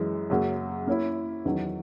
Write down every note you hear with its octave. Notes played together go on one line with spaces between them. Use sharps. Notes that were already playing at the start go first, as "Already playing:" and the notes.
Already playing: F#2 E3 G#3
F#2 C#3 F#3 A#3
A#3 C#4 E4
E2 D#3 F#3